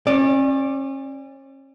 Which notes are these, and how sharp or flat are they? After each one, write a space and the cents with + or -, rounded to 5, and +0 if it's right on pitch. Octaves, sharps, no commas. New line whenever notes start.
C#4 -35 D5 +0